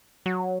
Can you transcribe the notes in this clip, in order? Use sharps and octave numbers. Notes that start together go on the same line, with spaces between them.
F#3